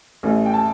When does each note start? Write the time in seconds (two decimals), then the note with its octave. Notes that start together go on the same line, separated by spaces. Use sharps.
0.23 A1 A2 A3
0.46 G5
0.54 A5